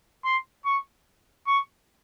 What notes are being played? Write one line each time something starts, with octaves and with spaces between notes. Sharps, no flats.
C6
C#6
C#6